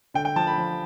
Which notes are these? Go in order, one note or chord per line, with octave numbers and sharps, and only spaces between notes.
D3 G5
G5
F3 A5
B5
F3